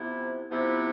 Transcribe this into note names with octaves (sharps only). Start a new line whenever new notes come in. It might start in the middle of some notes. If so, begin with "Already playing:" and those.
Already playing: C3 F3 B3 E4
C3 F3 B3 E4